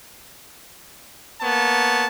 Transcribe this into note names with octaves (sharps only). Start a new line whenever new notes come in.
A#3 B3 C#5 A5